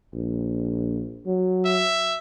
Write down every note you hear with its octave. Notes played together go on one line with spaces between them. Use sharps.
A#1
F#3
E5